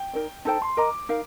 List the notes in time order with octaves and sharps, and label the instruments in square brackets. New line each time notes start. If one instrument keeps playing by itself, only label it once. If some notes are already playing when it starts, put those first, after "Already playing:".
Already playing: [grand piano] G5
[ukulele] D#4 A#4 D5
[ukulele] D#4 A4 C5 G5 [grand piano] A5
[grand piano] C6
[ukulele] A#4 D#5 A#5 [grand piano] D6
[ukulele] D#4 A#4 F5